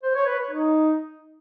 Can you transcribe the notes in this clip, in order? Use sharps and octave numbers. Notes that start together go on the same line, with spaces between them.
C5
C#5
B4
C#5
D#4